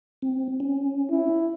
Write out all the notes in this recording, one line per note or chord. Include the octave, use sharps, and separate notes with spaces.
C4
C#4
E4